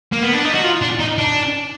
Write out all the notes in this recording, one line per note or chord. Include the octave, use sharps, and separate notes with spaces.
A#3
B3
D4
D#4
F#4
F4
D4
D#4
D4